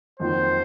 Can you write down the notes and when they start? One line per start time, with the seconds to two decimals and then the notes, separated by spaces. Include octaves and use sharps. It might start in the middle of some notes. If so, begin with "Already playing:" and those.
0.19 F2 D#3 F#3 A#3 F4 C5